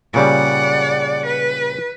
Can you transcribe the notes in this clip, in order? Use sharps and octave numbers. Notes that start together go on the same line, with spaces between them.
A#2 C#3 G3 D5 F#5
B4